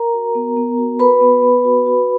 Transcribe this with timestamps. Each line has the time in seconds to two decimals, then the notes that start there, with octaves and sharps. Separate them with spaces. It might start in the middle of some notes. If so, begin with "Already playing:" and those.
Already playing: A#4 A#5
0.14 F#4
0.35 B3
0.56 B3
0.78 F#4
0.99 F#4 B4 B5
1.21 B3
1.42 B3
1.64 F#4
1.86 F#4